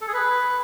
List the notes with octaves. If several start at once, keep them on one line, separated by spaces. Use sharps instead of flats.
A4
G#4
B4